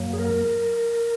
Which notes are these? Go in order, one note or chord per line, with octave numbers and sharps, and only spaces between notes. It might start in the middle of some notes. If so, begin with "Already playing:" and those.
Already playing: F#2 F#3 A#3
G#4
A#4